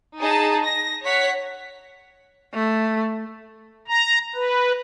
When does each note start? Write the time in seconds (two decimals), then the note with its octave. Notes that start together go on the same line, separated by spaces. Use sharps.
0.19 D#4 G#4 A5
0.64 A#6
1.04 C#5 F#5 B6
2.53 A3
3.88 A#5
4.35 B4